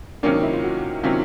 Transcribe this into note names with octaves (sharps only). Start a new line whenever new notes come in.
C3 D#3 F#3 A#3 C#4 D4
D#4
E4
F4
F#4
C3 D#3 F#3 A#3 C#4 F4